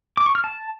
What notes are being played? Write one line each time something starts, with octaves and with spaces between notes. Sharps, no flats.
D6
C#6
F6
A5